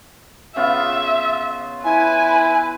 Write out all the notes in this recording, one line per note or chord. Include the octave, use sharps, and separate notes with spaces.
C#3 B3 F4 E5
E4 B4 G#5